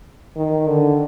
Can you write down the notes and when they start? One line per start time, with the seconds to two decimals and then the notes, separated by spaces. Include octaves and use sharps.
0.36 D#3
0.67 D3